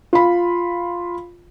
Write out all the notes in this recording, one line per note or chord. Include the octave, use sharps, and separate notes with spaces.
F4 B5